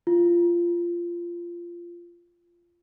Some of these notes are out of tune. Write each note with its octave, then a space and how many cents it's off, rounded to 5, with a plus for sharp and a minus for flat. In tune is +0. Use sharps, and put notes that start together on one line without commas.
F4 -15